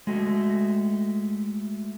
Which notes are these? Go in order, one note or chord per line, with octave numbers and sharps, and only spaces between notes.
G#3 A3 F#4